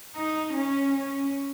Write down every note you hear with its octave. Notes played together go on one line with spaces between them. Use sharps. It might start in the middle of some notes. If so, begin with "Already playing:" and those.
D#4
C#4
C#4